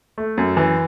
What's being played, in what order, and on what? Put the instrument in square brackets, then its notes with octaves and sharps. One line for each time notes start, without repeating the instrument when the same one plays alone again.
[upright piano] A3
F#2
E3